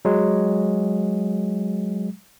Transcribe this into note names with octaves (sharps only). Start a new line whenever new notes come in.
F#3 G#3